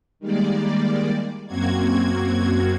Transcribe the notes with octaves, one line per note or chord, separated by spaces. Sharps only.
D#3 G3 G#3 A#3 D5
F#2 A#3 C4 F#4 G#6